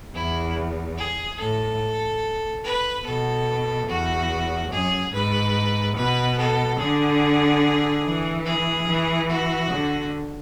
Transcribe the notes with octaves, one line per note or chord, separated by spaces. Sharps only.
E2 E4
G#4
A2 A4
B4
B2 A4
E2 F#4
F#2 G#4
G#2 B4
B2 B4
A4
D3 G#4
E3
G#4
E3
F#4
D3